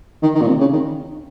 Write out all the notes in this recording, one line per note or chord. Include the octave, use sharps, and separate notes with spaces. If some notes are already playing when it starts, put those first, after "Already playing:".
D#3
D#3
A#2
C3
C#3
D#3